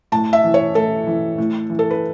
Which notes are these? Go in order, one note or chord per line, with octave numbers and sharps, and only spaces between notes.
A2 A5
E5
E3
C#5
A2 A4
E3
A2
E3
A4
B4